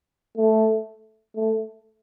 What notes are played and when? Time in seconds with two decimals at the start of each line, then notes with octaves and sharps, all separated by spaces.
0.37 A3
1.36 A3